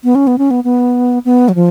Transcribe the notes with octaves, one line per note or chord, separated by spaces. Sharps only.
B3
C#4
B3
C#4
B3
B3
B3
F#3
F3